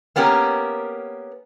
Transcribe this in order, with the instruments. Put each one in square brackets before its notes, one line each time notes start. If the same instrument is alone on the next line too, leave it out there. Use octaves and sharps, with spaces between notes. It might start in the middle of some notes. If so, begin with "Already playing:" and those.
[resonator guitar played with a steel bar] A#3 B3 C#4 G4 A#4